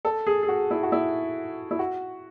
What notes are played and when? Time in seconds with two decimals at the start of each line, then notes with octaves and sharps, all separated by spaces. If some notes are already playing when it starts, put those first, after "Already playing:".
0.05 A4
0.27 G#4
0.43 G#4
0.48 F#4
0.71 E4
0.83 F#4
0.92 E4
1.71 E4
1.79 F#4